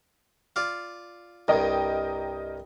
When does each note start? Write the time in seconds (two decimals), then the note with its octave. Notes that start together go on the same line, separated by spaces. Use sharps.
0.56 F4 D5 F5
1.48 C2 G2 A#4 D#5 G5